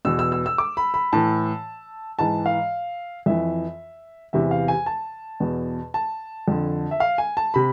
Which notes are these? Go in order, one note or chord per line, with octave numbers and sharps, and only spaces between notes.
E2 B2 E6
E6
E6
E6
D6
B5
B5
A2 E3 A5
G#2 E3 A5
F5
F2 E3 E5
E2 C3 E3 E5
F5
G#5
A5
E2 B2
A5
F2 D3
E5
F5
G#5
A5
C3 B5